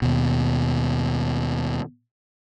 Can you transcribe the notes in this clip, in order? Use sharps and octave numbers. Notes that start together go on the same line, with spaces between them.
D#2 B2